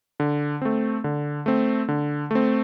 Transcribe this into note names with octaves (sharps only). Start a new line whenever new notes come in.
D3
A3 C4
D3
A3 C4
D3
A3 C4